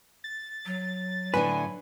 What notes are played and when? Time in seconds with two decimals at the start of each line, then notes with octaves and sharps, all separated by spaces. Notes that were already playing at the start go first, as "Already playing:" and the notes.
0.24 A6
0.66 F#3
1.34 A2 D3 D4 B4 G#5